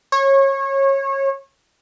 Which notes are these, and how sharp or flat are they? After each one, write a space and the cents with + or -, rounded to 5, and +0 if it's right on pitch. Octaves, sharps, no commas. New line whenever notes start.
C#5 -25